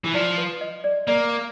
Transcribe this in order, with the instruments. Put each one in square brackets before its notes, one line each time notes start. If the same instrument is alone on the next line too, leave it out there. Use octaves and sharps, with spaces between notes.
[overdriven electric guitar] E3
[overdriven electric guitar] F3 [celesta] D5
[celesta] B4
D#5
D5
[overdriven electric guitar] A#3 [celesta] D5